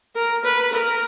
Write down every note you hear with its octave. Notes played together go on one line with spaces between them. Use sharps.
A#4
B4
A#4